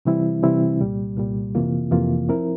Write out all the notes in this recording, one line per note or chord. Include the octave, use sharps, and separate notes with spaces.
C3 E3 G3 C4 E4
C3 E3 G3 C4 E4
C2 A#2 G3
C2 A#2 G3
F2 C3 E3 A#3 F4
F2 C3 E3 A#3 F4
F3 C4 E4 A#4